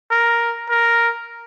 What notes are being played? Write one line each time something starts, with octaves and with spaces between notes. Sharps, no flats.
A#4
A#4